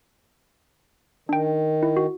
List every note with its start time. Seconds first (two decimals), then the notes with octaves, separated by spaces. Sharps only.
1.29 D#3 D4 G5
1.83 E4
1.97 F#4